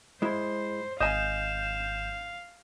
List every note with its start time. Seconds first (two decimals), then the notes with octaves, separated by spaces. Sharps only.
0.22 G#3 E4 C5
1.00 G#1 D#5 F5 G#5 G6 E7